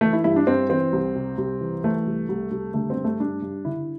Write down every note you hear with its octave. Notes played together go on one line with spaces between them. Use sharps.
E3 A3
E4
G2 E4
D4
G2 C4
E3 C4
C2
C3
C2
E3
E3 A3
C2
C2
C2
D3 A3
C4
G2
A3
G2 D4
G2
D3 E4